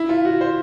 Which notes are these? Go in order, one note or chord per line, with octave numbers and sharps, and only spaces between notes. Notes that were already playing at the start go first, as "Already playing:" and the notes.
Already playing: E4
F4
F#4
C5